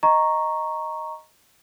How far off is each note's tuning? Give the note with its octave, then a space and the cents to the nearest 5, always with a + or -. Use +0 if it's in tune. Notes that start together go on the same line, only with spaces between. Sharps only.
D#5 +0 A#5 +0 C#6 -5